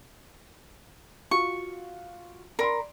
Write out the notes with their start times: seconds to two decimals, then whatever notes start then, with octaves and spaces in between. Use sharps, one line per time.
1.31 F4 F#4 C#6
2.59 A#4 D5 B5 C6